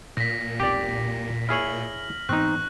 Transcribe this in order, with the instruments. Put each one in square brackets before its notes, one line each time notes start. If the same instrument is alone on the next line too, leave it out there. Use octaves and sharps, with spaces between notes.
[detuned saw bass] A#2 [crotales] A#6 B6
[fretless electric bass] E1 B1 C4 [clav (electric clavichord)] G4 D5
[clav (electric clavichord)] E4 G#4 C#5 [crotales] F6 F#7
[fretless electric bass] G#2 E3 B3 [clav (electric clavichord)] C4 D#4 [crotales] C#6 F#6